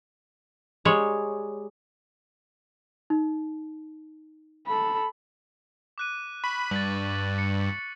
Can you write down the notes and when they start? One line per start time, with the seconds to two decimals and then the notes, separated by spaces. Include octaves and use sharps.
0.85 G3 G#3 C#5
3.10 D#4
4.67 A4 B5
5.98 D6 F#6 D#7
6.44 B5 C#6
6.71 G2 A6 B6 F#7
7.38 C#7